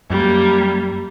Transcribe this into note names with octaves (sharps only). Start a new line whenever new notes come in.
F#2 G3 A#3